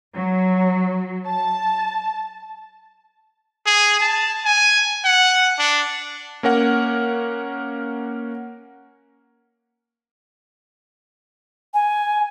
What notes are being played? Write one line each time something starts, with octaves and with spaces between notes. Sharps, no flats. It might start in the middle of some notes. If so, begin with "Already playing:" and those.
F#3
A5
G#4
A5
G#5
F#5
D4
A#3 C#4 A#4 F#5
G#5